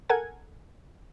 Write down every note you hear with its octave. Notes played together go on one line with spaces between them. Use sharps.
A4 A#4 F#5 G#5 G#6